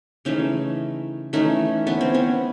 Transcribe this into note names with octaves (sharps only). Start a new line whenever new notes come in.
C#3 E3 A3 C#4 D#4
E3 A3 C#4 D#4
B3 C#4
C4
B3 C#4